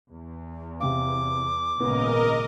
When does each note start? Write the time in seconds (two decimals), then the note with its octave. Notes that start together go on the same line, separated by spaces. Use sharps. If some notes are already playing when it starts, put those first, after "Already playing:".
0.10 E2
0.80 C3 F5 D6
1.80 G#1 A#2 C#3 B3 A#4 D#5